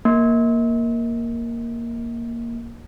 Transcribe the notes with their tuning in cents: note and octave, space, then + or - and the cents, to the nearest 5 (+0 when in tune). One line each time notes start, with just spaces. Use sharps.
A#3 +0